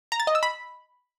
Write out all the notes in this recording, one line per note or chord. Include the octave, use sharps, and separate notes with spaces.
A#5
A6
D#5
E6
B5